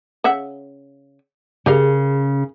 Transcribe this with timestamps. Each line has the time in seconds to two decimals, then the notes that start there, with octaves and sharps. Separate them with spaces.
0.24 C#3 E5 F#5
1.66 C#3 G4 A#4 F5